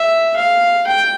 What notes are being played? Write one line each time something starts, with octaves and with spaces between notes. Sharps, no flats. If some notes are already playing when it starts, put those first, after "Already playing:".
Already playing: E5
F5
G5